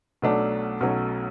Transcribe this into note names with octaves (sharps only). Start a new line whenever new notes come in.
B1 B2 F#3 A3 D4
B1 B2 F#3 A3 C#4